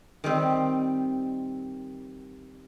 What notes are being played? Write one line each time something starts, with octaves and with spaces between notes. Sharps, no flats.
D#3 G3 C4